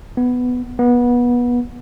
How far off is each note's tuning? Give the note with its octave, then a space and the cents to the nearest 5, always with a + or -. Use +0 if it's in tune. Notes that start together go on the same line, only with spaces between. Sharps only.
B3 +5
B3 -25